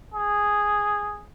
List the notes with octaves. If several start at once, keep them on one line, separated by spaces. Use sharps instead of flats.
G#4